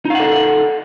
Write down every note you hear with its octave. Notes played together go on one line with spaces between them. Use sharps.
D#4 A4 F5 F#5